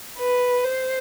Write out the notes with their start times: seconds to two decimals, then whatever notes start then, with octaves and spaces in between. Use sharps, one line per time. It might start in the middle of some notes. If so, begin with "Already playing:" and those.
0.17 B4
0.64 C5